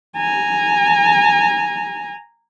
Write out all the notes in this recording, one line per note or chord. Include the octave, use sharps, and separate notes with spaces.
G#5 A#5